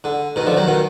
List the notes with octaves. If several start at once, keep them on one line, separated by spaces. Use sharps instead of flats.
D3
B2 D#3
D3 F3
D#3 F#3
B2 D#3